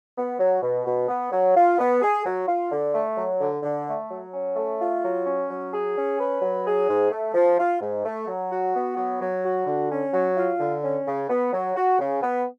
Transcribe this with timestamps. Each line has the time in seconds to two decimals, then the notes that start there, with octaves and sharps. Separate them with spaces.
0.16 B3
0.38 F#3
0.62 B2
0.85 B2
1.08 B3
1.31 F#3
1.55 F4
1.78 B3
2.02 G#4
2.25 F#3
2.47 F4
2.71 D3
2.94 A3
3.17 F#3
3.40 D3
3.63 D3
3.87 A3
4.10 F#3
4.34 C#4
4.56 A3
4.80 F4
5.03 F#3
5.26 C#4
5.50 F#3
5.72 G#4
5.96 C#4
6.19 B4
6.42 F#3
6.66 G#4
6.88 G#2
7.11 A3
7.34 F3
7.58 F4
7.81 G#2
8.04 A3
8.27 F#3
8.50 F#4
8.74 B3
8.97 F#3
9.20 F#3
9.43 F#4
9.66 D3
9.90 C#4
10.13 F#3
10.37 F4
10.59 D3
10.82 C#4
11.06 C#3
11.29 B3
11.52 F#3
11.75 F#4
11.99 C#3
12.22 B3